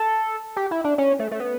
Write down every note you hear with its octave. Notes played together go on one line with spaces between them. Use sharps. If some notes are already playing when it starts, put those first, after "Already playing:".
Already playing: A4
G4
E4
D4
C#4
A3
A3
B3